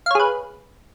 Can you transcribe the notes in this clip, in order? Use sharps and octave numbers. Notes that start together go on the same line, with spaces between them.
G#4 B4 C#5 F5